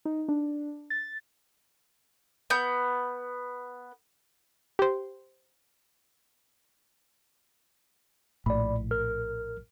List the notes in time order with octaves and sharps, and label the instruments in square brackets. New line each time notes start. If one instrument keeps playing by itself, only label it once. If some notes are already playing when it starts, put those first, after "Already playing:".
[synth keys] D#4
D4
A6
[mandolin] B3 G6
[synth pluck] G4 C5
[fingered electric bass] A#1 A2 [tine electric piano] D5 B5
[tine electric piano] A#4 F6